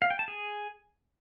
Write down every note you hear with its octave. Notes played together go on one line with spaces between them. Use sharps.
F5
G5
A5
G#4